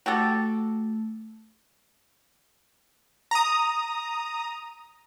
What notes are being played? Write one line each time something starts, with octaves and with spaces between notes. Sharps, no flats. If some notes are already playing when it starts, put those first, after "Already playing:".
A3 F#4 G4 A4
A#5 D#6